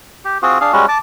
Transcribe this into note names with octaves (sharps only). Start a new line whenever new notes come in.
G4
C4 F4 F#4 G#4
D4 G#4 F5
G3 G#3 C#4 F#4
A5 D6